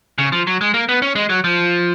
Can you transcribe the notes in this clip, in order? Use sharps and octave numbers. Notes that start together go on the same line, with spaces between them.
C#3
F3
F#3
G#3
A#3
B3
C#4
G#3
F#3
F3